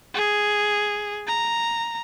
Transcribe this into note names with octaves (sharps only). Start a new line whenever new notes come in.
G#4
A#5